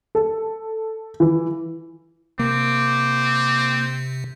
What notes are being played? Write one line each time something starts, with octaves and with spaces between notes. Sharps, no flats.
A4
E3
C3 A#3 C4 D6